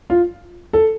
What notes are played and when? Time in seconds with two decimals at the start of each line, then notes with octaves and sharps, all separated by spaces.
0.10 F4
0.73 A4